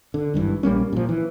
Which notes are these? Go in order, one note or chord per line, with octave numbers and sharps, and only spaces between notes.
D3
G#1 G2 D3 E3
A#1 G3 A#3 C#4
A#2 F3
E3